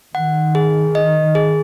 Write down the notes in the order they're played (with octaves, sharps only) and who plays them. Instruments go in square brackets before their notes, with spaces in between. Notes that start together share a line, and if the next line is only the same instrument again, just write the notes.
[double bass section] D#3 [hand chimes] F#5
[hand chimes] G#4
D#5
G#4